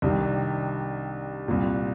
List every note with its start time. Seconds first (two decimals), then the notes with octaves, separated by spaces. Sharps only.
0.02 C2 C3 D#3 D4
1.48 C2 A#2